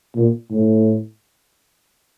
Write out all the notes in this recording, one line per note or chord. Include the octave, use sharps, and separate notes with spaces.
A#2
A2